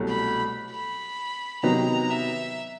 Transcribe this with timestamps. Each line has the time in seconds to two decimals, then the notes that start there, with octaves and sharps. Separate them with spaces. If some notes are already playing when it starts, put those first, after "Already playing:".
Already playing: C2 B2 F#3 A3
0.08 B5
0.71 B5
1.63 C3 D#3 F#3 B3 D#4 A#5
2.11 E5